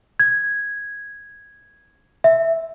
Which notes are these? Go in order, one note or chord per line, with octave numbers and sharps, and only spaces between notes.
G#6
E5